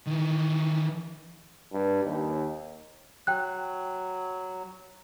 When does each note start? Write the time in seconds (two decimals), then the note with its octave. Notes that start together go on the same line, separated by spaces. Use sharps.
0.07 D#3 E3
1.73 G2
2.05 D#2
3.27 F#3 G5 F#6